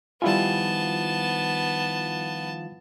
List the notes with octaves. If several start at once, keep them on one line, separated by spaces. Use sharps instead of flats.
D#3 F3 G3 B3 E4 F4 G#5 A5